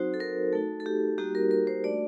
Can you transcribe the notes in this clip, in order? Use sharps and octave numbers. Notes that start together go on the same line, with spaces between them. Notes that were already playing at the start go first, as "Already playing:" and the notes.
Already playing: F#3 C4 D#4 F#4 C5
A4
A#4
A3 D#4 F#4 A4
A4
G4
G3 A#3 D#4 F#4 G4
A#4
A#4
C5
A3 D4 F#4 D5